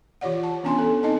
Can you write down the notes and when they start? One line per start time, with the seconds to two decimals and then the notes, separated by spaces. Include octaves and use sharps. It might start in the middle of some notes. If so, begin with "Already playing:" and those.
0.21 E3 F4 G4 C#5 D5 F#5
0.43 A5
0.63 E3 B3 C#4 D4 G#5 C6
0.78 A4
1.03 C4 D#4 D#5 A5